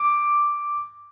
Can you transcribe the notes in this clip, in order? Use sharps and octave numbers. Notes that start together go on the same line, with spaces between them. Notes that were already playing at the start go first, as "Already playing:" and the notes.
Already playing: D6